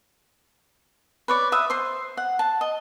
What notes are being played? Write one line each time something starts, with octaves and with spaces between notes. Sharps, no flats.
B4 C#5 D5
B4 E5 D#6
C5 C6
F#5
A5
D#5